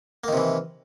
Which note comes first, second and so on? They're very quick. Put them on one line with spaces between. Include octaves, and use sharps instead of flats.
A#3 D#3 C3 E3